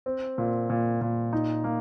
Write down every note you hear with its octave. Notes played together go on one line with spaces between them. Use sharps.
C4
A#2
A#2
A#2
D#4
A#3